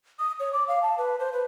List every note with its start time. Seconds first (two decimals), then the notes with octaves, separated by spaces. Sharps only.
0.19 D#6
0.40 C#5
0.53 D6
0.68 F5
0.83 A5
0.98 B4
1.19 C5
1.33 B4